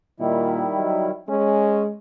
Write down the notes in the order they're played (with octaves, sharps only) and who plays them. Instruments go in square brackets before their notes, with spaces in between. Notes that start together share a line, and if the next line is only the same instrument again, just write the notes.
[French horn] A#2 [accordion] D#3 G3 E4
[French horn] F#3
[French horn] G#3 [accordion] C#4